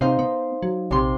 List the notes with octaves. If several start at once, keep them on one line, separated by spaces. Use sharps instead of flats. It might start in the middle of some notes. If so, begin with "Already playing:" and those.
C3 D#4 C5 F5
B3
F#3
A#1 C3 C6